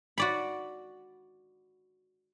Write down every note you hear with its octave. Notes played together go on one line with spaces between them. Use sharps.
F#4 D5 B5